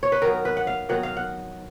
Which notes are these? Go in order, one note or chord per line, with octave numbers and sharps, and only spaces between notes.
C#5
B4
D#3 F#3 B3 A#4
B4
F#5
F5
D#3 F#3 B3 F#5
F5
F#5